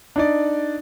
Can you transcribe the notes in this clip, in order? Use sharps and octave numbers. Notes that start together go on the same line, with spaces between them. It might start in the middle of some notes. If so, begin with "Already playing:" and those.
D4 D#4 D5